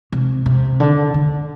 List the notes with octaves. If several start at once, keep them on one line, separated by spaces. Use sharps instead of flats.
C3
C3
D3
D3